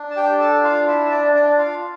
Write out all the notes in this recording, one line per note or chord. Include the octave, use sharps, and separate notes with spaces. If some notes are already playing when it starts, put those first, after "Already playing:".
Already playing: D4
A5
G4 G5
A4 A5
F4 F5
E4 E5
E5
D4 D5
D4 D5
F4 F5